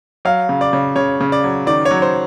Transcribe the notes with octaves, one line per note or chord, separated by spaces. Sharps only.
F#3 F5
C#3
D5
C#3
C#3 C#5
C#3
D5
F#3
D#3 D5
C#5
F#3
C5